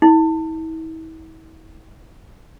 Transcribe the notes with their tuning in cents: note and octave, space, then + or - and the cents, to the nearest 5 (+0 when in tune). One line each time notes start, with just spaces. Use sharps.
E4 -40